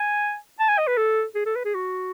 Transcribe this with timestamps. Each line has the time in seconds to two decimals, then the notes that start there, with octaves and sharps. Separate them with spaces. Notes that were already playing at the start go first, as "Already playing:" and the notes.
Already playing: G#5
0.60 A5
0.69 G#5
0.78 D#5
0.87 B4
0.97 A4
1.35 G#4
1.46 A4
1.55 B4
1.65 G#4
1.75 F#4